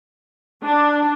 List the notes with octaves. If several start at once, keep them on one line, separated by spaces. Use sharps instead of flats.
D4